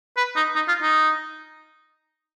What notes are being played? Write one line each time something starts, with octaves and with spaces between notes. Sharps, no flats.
B4
D#4
D#4
F4
D#4